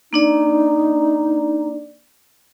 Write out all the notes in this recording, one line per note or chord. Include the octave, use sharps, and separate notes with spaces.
A#3 D4 D#4 D5